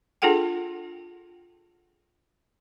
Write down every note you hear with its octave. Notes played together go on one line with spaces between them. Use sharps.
D4 F4 G#4 A4 F#5 G5